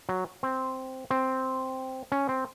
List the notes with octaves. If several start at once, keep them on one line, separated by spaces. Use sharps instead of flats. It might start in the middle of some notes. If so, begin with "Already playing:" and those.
F#3
C4
C4
C#4
C4